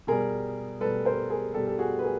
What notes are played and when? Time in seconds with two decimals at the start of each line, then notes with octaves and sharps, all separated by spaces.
0.07 B2 G3 G#4 A#4
0.81 G3 A4 B4
0.85 B2
1.05 A#4 C5
1.30 G#4 A#4
1.54 B2 G3 G4 A4
1.68 A4
1.79 F#4 G#4
1.99 B4
2.04 G#4 A#4